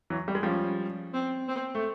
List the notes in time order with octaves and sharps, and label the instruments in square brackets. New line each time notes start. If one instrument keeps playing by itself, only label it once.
[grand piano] E3 F#3
G3
G#3
[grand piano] F3 G3 [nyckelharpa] C#4
[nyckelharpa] C4
C4
[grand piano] A3